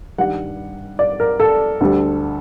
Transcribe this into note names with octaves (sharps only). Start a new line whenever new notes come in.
G2 D#3 G3 F#5
D5
A#4
A4
D2 D3 G3